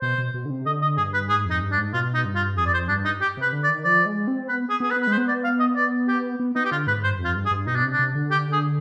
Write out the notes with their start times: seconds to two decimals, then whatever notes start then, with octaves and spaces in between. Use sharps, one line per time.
0.02 B2 C5
0.18 B2
0.34 B2
0.45 D3
0.50 C3
0.66 D3 D#5
0.82 D#5
0.97 G2 G#4
1.14 B4
1.29 G#2 G#4
1.45 F2
1.50 D#4
1.61 G2
1.72 D4
1.77 G#2
1.93 B2 F4
2.14 D#4
2.25 G2
2.35 F4
2.57 F2 G#4
2.66 D5
2.74 C5
2.89 G2 D4
3.05 D#4
3.21 G4
3.37 C3 B4
3.53 D3
3.63 D5
3.68 D#3
3.84 F3 D5
4.06 G#3
4.28 C4
4.48 B3 B4
4.70 G#4
4.80 B3 G#4
4.91 B4
4.96 B3
5.02 B4
5.07 G#3
5.12 C5
5.18 B3
5.28 D5
5.44 F5
5.60 D#5
5.76 D5
6.08 G4
6.40 B3
6.56 B3 D#4
6.65 G4
6.72 D3 F4
6.87 G#2 B4
7.04 G2 C5
7.19 F2
7.25 F4
7.35 G2
7.46 G#4
7.51 G2
7.67 B2 D#4
7.76 D4
7.83 C3
7.93 D4
7.99 C3
8.15 D3
8.31 G4
8.53 G#4